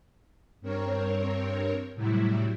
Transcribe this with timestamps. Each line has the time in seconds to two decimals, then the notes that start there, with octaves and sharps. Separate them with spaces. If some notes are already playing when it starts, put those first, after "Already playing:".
0.61 G2 C4 A#4 C#5
1.94 A2 C3 F#3 G3 E4